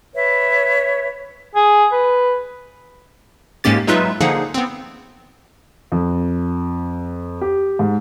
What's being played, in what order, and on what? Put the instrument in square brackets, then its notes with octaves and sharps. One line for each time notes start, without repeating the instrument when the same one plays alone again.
[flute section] B4 C#5 E5
[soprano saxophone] G#4
B4
[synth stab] G#2 G#3 A#3 C#4 G4 A6
F#3 G#3 D#4 F4 B4 E5
D3 F3 A#3 D#4 G#4 F#5
B3 C4
[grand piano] F2
G4
G#2